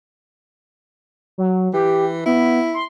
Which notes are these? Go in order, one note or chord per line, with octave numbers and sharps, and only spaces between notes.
F#3
E3 G4
B3 E4
C6